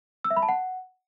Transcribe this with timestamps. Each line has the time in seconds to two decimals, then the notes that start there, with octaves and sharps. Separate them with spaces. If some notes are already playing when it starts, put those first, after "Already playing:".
0.24 E6
0.31 E5
0.37 B5
0.43 A5
0.49 F#5